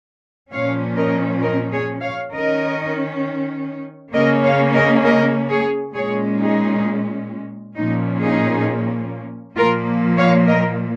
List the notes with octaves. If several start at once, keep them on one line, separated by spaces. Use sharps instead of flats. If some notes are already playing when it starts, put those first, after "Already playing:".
A#2 F3 C#4 C#5 F5
A#4 D#5
A#4 D#5
G#4 C#5
C#5 F5
D#3 C#4 A#4 D#5
C#3 A#3 C#4 A#4 D#5
C#5 F5
A#4 D#5
A#4 D#5
G#4 C#5
A#2 G#3 C#4 G#4 C#5
D#4 G#4
A#2 F3 A#3 C#4 D#4
D#4 G#4
A#2 F3 A#3 F4 A#4
C#5 F5
A#4 D#5